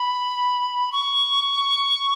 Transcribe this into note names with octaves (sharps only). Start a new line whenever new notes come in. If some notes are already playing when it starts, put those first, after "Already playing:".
Already playing: B5
C#6